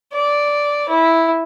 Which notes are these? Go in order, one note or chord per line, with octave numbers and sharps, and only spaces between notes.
D5
E4